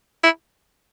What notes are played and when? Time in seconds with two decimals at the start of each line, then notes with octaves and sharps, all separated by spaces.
0.24 E4